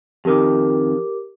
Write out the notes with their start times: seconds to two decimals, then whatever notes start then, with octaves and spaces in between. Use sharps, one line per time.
0.25 F2 D#3 G4 A#4 D6